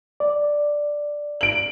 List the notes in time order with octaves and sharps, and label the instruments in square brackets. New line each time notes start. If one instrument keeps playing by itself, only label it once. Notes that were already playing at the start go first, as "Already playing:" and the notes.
[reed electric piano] D5
[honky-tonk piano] D7 F#7